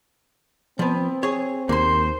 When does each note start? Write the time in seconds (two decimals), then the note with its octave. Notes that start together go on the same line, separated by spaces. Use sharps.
0.79 F3 B3 C4
1.23 G#4 C#5
1.69 D#2 A#3 C5 C6